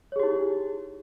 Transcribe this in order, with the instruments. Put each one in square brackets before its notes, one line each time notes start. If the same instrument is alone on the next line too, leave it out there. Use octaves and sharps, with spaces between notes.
[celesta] C#5
G#4
G4
E4
D#4